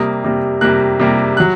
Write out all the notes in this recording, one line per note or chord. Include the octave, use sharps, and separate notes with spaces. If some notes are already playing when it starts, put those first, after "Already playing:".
Already playing: C3 G3 A#3 D#6
C3 G3 A#3
C3 G3 A#3 F#6
C3 G3 A#3
F#3 F#6